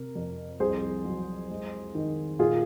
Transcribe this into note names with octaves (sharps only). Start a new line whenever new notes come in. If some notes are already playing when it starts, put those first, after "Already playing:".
Already playing: C3 A#4
F2
C2 G#4 C5
F#3
G#3
D#3
A#2 F4 G#4